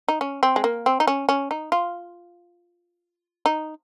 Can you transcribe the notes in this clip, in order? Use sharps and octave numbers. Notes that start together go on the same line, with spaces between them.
D#4
C#4
C4
G#3
A#3
C4
D#4
C#4
C#4
D#4
F4
D#4